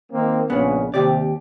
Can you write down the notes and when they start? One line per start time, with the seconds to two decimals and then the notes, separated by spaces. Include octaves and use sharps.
0.13 D#3 A#3 C4
0.50 A#1 C#3 B3 C#4 D4
0.94 D#2 C3 G4 D5